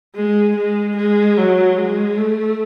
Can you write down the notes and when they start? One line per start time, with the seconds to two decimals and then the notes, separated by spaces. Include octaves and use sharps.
0.16 G#3
0.57 G#3
0.97 G#3
1.37 F#3
1.78 G#3
2.17 A3